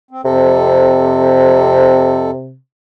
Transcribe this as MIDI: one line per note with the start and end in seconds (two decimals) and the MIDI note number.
0.11 0.21 60
0.25 2.31 41
0.25 2.57 48
0.25 2.31 69